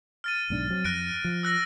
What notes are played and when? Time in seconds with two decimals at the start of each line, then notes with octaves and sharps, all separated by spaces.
0.24 F6 A6 D#7
0.50 B1 G#2 D4
0.70 F#3 C4
0.84 F2 F#6 A#6 D7
1.24 F3
1.43 E6 F#6 A#6